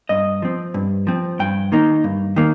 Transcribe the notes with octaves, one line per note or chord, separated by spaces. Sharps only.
G2 D#5
F3 C4
G2
F3 C4
G2 G5
D#3 A#3 D#4
G2
D#3 A#3